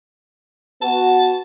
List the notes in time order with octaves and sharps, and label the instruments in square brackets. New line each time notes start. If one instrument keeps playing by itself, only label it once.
[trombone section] B3 F#4 [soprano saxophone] A5